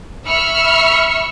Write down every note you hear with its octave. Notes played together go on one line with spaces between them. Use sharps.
E5 B5 C#6 E6 F6 C#7